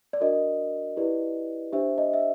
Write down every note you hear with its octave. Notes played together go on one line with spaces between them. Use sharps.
D5
D4 F#4 A#4 D#5
E4 G4 B4 D5
D4 G4 C5 E5
D#5
E5